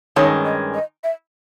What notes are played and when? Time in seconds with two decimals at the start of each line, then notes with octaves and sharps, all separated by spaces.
0.16 G2 D#3 G#3 C#4 C#5
0.45 D#5
0.74 D#5
1.04 E5